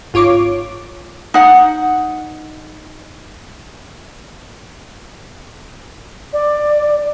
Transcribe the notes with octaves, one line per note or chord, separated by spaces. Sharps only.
G#1 F4 C#5 D6
D#4 F#5
D5